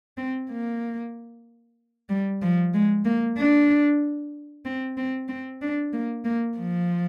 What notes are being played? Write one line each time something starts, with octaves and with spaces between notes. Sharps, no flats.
C4
A#3
G3
F3
G#3
A#3
D4
C4
C4
C4
D4
A#3
A#3
F3